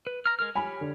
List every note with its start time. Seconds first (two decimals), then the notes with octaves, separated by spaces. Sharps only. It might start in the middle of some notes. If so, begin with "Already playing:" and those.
0.07 B4
0.26 A#5 F6
0.39 G#3 A#4 F6
0.55 G4 C#5 G#5 B5
0.81 D3